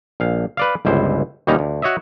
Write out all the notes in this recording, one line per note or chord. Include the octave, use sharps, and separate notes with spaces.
A#1 F5
B4 D5 F5
G1 C#2 E4 C5
D#2 B2 G3 C#4 D#4 A#5
D2
F#4 C#5 D#5 E5